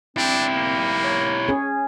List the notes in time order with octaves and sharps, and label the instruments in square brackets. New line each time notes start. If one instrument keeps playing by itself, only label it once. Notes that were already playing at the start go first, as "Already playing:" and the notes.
[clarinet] C4 [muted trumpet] D4 [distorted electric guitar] E4 G4
[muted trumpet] A#3
[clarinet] C#5
[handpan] C#4 G#4